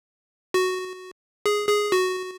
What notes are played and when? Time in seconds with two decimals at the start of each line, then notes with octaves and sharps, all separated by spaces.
0.54 F#4
1.46 G#4
1.69 G#4
1.92 F#4